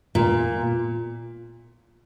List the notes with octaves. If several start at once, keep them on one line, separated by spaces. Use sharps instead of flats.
A#2